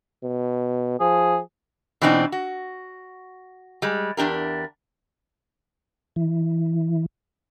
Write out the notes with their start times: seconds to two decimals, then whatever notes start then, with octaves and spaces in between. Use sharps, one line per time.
0.23 B2
1.00 F3 G#4
2.01 B2 E3 C4 D4 D#4
2.32 F#4
3.82 G3 G#3
4.17 E2 D4 G4 A#4
6.16 E3